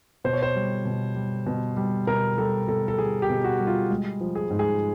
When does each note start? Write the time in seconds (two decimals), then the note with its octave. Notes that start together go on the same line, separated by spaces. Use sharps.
0.24 B2 C5
0.33 C#5
0.42 C5
0.55 G3
0.85 B2
1.16 G3
1.46 B2
1.77 G3
2.07 B2 A#4
2.38 G3 A4
2.68 B2 A4
2.88 A4
2.98 G3 G#4
3.22 G4
3.30 B2
3.44 F#4
3.59 G3
3.67 F4
3.90 G#3
4.21 F3
4.35 G#4
4.50 G#2
4.59 G#4